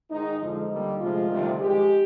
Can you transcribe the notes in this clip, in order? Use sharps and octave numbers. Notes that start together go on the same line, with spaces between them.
G#2 D#3 G#3 D#4
F2 D3 F3 G#3 D#4
D#2 D3 G3 A#3
D2 C3 F3 G#3 F4
D2 C3 D#3 G3
F2 D#3 G#3 G4